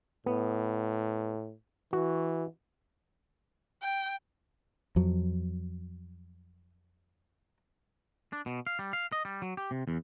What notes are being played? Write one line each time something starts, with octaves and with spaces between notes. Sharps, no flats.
A2 B3
E3 F#4
G5
F2 F#3
D4
B2
F5
G3
F5
D#5
G3
F#3
G4
C3
E2